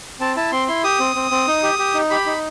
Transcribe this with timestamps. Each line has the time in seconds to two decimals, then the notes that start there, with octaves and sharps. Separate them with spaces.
0.20 C4 A5
0.36 E4 A5
0.52 C4 C6
0.68 E4 C6
0.84 G4 D#6
1.00 C4
1.15 C4
1.31 C4
1.48 D#4
1.63 G4
1.79 G4
1.94 D#4
2.10 G4 B5
2.27 D#4